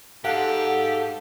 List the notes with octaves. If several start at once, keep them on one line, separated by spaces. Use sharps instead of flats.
G#2 G4 A4 F5 F#5